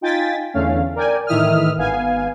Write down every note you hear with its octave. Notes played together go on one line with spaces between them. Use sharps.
D#4 F4 G5 G#5 A6 B6
E2 D3 A3 C#4 F5
A#4 D5 G5 G#5
A2 D#3 E3 E5 D#6 F6
G#1 B3 F5 G#5